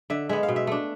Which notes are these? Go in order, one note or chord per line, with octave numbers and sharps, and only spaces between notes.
D3 E5
G#3 B3 E5
F5
B2
E5
A3 D4